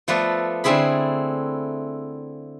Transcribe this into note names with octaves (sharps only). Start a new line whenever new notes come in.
F3 A3 B3 A4 B4 D5
D3 A3 C4 E4 G#4 B5